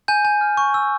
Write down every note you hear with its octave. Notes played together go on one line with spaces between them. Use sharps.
G#5 G6
G#5
F6
C#6
E6